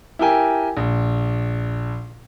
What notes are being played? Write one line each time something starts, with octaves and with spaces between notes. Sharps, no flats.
E4 G4 A#4 G5 G#5
A#1